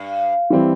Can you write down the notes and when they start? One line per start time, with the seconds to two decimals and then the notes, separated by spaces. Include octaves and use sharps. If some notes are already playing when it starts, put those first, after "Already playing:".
Already playing: G2
0.50 E3 G3 C4 E4